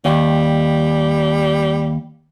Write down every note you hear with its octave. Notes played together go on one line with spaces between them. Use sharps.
D#2 G3